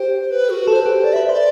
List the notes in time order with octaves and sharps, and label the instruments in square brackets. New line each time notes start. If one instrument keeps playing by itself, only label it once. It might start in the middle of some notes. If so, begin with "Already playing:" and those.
Already playing: [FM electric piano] G4 [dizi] C5
[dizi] B4
F#4
[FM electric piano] A4 [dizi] C5
[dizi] B4
[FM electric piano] G4
[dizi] C5
[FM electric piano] A4 [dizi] D5
[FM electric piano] B4 [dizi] E5
[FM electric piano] C5 [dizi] D5